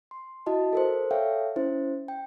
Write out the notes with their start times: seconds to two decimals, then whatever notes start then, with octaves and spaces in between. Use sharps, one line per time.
0.11 C6
0.46 E4 F#4 D#5 A5
0.73 A4 A#4 C5
1.11 A4 C#5 E5 F5 G5
1.56 C#4 E4 C5
2.08 G5